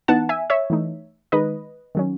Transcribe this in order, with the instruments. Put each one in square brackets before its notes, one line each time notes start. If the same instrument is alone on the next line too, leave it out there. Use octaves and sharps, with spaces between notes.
[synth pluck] E3 B3 D#4 F#5 A5
E5 G#5
C#5 E5
E3 A3 D#4
D#3 G#3 D#4 B4 D#5
D#3 F#3 C#4